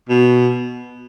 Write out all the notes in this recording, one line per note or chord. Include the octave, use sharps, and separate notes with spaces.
B2